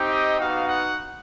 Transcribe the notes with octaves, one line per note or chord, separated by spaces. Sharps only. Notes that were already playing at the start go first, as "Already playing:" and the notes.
Already playing: C4 D#4 G4
D#5
B3 D#4 F#4 F5
F#5